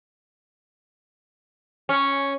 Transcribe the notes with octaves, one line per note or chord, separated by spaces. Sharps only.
C#4